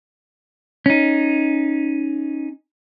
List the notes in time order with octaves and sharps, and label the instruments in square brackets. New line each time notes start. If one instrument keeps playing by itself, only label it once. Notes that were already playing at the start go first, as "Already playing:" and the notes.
[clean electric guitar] C#4 D#4